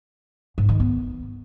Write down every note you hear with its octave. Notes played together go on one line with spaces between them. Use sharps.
G#2
D#3
B3